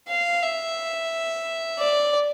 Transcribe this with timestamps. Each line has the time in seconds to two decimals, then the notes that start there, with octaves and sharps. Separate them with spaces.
0.09 F5
0.43 E5
1.79 D5